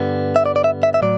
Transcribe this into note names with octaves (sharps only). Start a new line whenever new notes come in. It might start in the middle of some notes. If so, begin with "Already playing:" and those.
Already playing: G2 D3 G3 B3
E5
D5
D5
E5
E5
E5
A2 F#3 D5